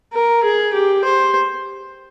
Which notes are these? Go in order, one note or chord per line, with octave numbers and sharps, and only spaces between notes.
A#4
G#4
G4
C5